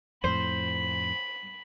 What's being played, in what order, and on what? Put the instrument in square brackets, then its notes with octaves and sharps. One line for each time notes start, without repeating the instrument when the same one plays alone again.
[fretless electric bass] F2 A2 [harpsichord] C5 [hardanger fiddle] B5